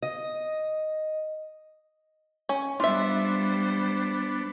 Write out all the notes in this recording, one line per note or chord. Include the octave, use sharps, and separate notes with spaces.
D#5
C#4
G3 B3 D4 F4 C5 E5